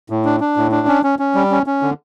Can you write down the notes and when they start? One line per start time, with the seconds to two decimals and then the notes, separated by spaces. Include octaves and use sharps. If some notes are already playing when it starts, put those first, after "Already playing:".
0.10 A2
0.25 D4
0.40 D4
0.57 A2
0.72 D4
0.87 C#4
1.04 C#4
1.19 C#4
1.35 G3
1.51 C#4
1.66 C#4
1.82 D3